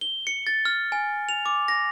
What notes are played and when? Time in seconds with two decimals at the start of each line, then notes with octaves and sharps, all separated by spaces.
0.01 G7
0.27 C#7
0.47 A6
0.65 F6
0.92 G#5
1.29 F7
1.46 D6
1.68 A#6